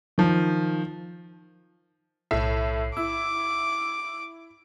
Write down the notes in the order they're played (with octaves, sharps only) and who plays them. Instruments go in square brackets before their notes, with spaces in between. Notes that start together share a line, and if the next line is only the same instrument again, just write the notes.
[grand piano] D#3 F3
[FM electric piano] B1 C7 [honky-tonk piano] A2 E5
[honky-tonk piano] E4 [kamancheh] D6 [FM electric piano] E6